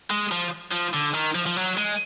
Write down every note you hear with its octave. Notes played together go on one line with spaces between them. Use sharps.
G#3
F3
F3
D3
D#3
F3
F3
F#3
G#3